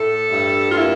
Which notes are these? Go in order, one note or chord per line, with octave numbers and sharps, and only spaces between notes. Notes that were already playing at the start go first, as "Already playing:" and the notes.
Already playing: A2 A3 A4
G2
F4
A#3 E4